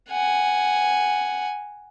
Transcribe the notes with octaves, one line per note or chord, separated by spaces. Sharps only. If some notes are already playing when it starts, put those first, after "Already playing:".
F#5 G#5